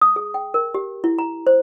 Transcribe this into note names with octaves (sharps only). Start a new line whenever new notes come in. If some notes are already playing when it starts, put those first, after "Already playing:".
D#6
G#4
G5
A#4
G4
E4
A#5
C5